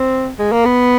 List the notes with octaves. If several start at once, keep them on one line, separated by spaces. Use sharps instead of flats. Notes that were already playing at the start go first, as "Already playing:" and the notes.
Already playing: C4
G#3
A#3
B3